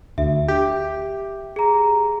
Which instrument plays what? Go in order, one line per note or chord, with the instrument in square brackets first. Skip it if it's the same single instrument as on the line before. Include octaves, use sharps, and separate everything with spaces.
[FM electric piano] D2 [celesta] E5
[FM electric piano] G4
[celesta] G#4 A#5